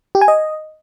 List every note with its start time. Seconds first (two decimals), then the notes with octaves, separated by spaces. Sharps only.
0.15 G4
0.21 G#5
0.28 D#5